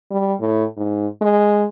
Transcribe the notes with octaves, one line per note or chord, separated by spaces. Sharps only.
G3
A2
G#2
G#3